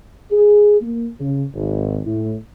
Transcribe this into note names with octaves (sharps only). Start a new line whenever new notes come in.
G#4
A#3
C#3
G#1
A2